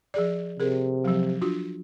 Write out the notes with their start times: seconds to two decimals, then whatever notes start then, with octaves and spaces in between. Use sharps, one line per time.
0.14 F3 G#4 D5
0.60 C3 G#4 A#4
1.04 F3 F#3
1.41 D4 F4 F#4